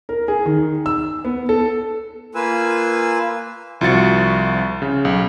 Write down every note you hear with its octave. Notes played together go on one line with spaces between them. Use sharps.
A#4
G#4
D#3
E6
B3
A4
A#3 F4 B4 G#5 E6
C2 F3 F#4 A6 C#7
C#3
B1